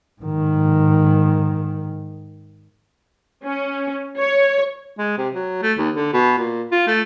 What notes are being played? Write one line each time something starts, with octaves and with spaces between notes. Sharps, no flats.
G#2 D#3
C#4
C#5
G#3
C3
F#3
A3
D#2
D3
B2
A#2
F4
A3